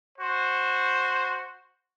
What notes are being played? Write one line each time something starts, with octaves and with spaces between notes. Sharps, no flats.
F#4 C5